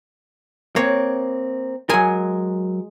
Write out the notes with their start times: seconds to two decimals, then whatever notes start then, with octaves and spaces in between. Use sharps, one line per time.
0.76 A#3 C4 C#5
1.89 F#3 G#3 A#4 G#5